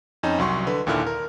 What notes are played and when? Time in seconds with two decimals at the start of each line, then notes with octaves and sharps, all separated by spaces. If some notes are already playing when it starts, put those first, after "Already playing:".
0.23 F2 C#4 D#4
0.38 C2 F#3 C6 C#6
0.67 D3 B4
0.87 D#2 A#2 D3 E4 F6
1.07 A#4